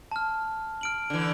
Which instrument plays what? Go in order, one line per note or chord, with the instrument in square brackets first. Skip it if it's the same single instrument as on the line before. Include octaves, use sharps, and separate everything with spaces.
[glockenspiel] A5 F6
F6 D7 F#7
[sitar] D3 E3